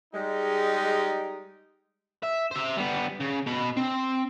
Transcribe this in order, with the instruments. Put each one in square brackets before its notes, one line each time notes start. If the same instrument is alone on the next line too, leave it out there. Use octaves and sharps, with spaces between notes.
[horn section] G3 G#3 D#4
[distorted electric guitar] E5
C5 E5
G3 B3
C#3
B2 B5
C4